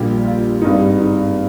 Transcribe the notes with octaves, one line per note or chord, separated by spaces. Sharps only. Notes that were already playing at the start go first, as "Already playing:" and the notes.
Already playing: A#1 A#2 G3 G4
F4
G#1 G2 G3 D#4
D#4